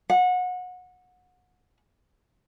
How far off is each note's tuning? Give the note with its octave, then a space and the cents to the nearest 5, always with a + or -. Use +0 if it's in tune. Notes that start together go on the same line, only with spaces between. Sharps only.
F#5 -25